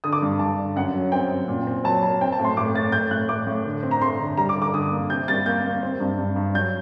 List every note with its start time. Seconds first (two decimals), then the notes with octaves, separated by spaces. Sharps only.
0.04 D3 D#6
0.13 D6
0.22 G2
0.39 G2 A5
0.57 D3
0.76 F#2 F#5
0.94 F#3
1.12 C4 G5
1.31 F#2
1.48 A#2
1.67 C4
1.84 F#3 A5
2.02 F#3 A5
2.21 C4 G5
2.32 A5
2.39 A2
2.45 C6
2.57 A2 D6
2.74 A2 A6
2.92 A2 G6
3.11 A2 F#6
3.29 A2 D6
3.47 A2
3.65 D3
3.83 C4
3.91 A#5
4.02 A3 C6
4.20 D3
4.37 G3 A#5
4.49 D6
4.56 D3
4.62 D6
4.74 D3 D#6
4.92 A#3
5.10 C3 G6
5.28 G3 A6
5.46 A#3 G6
5.64 A#3
5.83 C4
6.00 G2
6.18 G2
6.36 G2
6.54 F#3 G6